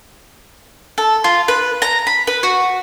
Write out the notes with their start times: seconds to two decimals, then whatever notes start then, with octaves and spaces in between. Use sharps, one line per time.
0.98 A4
1.24 F4
1.48 B4
1.82 A#5
2.07 B5
2.27 B4
2.43 F#4